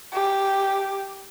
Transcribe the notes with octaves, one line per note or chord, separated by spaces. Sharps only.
G4